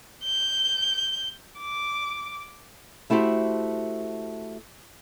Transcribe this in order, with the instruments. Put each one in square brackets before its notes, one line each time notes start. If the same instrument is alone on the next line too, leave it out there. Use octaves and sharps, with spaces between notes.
[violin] G6
D6
[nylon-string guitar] A3 E4 F#4 G4 C5